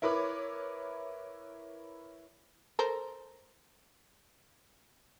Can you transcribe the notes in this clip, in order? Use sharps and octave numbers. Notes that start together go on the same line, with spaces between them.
E4 A#4 B4 C#5 B5 D6
A4 A#4 C5